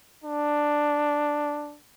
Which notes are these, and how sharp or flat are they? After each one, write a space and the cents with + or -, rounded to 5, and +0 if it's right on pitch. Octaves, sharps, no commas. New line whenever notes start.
D4 +5